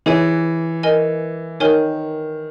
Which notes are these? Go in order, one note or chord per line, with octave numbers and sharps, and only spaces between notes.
E3 G#4 C#5 G#5
A#4 D#5 G#5
D#3 A#4 C#5 G#5